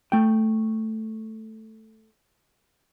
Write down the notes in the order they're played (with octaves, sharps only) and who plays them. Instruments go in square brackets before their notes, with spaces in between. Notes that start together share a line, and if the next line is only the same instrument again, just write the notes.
[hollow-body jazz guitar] A3 G5